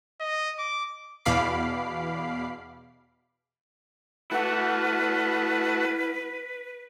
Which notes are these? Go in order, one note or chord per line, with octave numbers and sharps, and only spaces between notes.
D#5
D6
E2 B2 F5 B5 D6 C7
A3 E4 F#4 B4 F#5